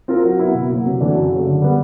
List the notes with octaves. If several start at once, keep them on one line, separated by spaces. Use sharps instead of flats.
C4 F4 A#4
F#3
B3 E4
B2
F#3 A#3
C3
E3 A3 D4 F#4
F#2
C#3 F#3 A3
D3
G3 B3